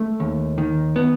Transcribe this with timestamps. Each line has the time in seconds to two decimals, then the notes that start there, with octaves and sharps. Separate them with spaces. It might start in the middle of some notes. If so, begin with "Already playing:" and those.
Already playing: A3
0.20 D#2
0.58 D#3
0.96 B3